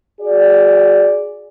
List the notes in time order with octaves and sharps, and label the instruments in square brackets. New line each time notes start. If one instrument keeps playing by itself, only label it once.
[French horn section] F#4 G#4 D5